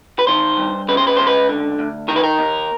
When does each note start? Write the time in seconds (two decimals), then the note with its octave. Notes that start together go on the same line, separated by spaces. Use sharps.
0.19 B4
0.27 D#3 C5
0.57 G2
0.88 C#3 B4
0.97 C5
1.07 B4
1.17 C#2 C5
1.27 B4
1.49 D3
1.79 D2
2.08 D#3 A#4
2.16 B4
2.23 A#4
2.39 D#2